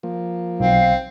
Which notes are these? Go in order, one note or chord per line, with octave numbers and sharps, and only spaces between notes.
F3 A#3
B1 C4 F5